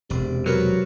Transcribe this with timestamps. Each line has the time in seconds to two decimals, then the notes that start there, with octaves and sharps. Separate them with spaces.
0.10 E1 C3 D5
0.46 F#3 A#4 B4 D5